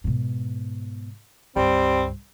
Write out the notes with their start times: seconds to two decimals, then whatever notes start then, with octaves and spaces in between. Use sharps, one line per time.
0.04 G#2 B2
1.56 C#2 G2 G3 C4